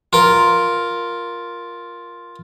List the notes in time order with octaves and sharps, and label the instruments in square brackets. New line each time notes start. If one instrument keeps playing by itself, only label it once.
[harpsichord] F4 A#4